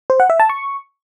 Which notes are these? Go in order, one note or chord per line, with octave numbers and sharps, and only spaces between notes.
C5
F#5
E5
A5
C#6